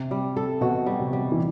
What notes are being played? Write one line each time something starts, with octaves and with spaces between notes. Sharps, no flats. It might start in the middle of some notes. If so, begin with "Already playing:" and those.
Already playing: C3
G3
A4
B2 F#4
G3
C3
G3
E3